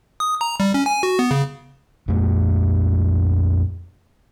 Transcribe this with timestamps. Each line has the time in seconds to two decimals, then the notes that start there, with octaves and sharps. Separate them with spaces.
0.20 D#6
0.41 A#5
0.60 G3
0.74 C#4
0.86 G#5
1.03 F#4
1.19 B3
1.31 C#3
2.08 F2 A#2 A3